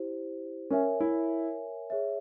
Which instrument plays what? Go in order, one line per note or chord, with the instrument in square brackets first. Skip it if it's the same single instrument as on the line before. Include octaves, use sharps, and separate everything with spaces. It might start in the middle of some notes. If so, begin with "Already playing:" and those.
Already playing: [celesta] E4 G4 C5
[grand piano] C#4 [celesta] A#4 C#5 E5 G#5
[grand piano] E4
[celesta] G#4 C#5 E5